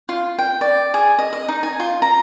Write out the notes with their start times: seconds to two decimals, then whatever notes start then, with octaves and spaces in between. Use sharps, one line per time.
0.09 F4
0.39 G5
0.61 D5
0.94 G#4
1.19 D#5
1.33 D#5
1.48 D#4
1.63 G#5
1.80 F4
2.02 A#5